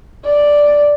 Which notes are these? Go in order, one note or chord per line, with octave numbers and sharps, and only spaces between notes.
D5